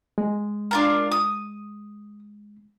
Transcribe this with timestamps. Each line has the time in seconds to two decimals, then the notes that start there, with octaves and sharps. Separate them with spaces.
0.18 G#3
0.71 D4 F4 A#4
1.12 D#6